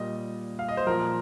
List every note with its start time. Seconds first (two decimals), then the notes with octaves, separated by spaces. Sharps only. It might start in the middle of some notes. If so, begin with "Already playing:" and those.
Already playing: A#2 G3 D#5
0.59 F5
0.68 D#5
0.77 C5
0.87 A#2 F3 A#4